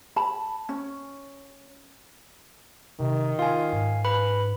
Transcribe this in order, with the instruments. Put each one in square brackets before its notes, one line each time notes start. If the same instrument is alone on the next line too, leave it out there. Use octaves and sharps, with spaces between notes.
[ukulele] A5 B5
C#4
[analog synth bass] C3 [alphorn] D#3
[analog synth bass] F4 [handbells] F5 G#5
[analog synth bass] G#2
[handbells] B4 B5